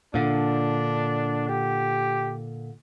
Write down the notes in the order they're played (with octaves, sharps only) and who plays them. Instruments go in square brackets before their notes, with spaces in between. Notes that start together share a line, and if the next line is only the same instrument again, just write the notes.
[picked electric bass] A#2 D3 [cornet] D4
[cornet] G4